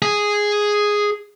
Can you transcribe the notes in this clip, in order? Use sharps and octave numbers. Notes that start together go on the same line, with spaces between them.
G#4